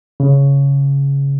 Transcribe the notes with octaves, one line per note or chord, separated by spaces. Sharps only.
C#3